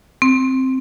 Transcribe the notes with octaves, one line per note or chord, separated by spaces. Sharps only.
C4